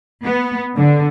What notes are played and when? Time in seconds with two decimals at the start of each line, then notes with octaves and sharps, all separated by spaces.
0.23 B3
0.76 D3